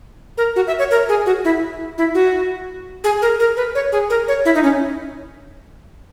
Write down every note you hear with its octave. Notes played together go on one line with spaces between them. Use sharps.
A#4
F#4
E5
C#5
A#4
G#4
F#4
E4
E4
F#4
G#4
A#4
A#4
B4
C#5
G#4
A#4
C#5
E4
D#4
C#4